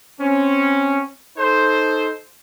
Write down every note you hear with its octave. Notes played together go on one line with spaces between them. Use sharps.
C4 C#4
D#4 A4 C5